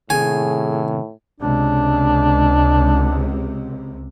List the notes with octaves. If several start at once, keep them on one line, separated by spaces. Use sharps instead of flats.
A2 C3 D#3 G#4 G#5
C#2 C3 D4